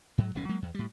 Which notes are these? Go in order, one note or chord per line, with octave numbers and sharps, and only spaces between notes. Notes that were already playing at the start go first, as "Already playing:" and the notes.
G#2 F#3
D1 B1 B2 C#4
F#3 G#3 A#3
E2
A2 G3